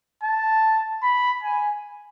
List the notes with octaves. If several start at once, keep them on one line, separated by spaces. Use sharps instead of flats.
A5
B5
G#5